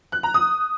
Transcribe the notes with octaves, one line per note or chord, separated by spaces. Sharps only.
F#6
A#5
D#6